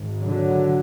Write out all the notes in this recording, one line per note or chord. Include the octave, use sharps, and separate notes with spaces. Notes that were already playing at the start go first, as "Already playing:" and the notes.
Already playing: G#1 G#2
D3 F#3